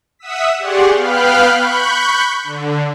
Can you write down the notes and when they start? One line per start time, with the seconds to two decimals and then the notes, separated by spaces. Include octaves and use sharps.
0.19 E5 F#5 D#6 E6 B6
0.59 G4 G#4 D5 F#5 C6 C#6
0.95 B3 F5 G5 B5 F6 F#6
1.56 B5 C#6 F#6 G6
2.44 D3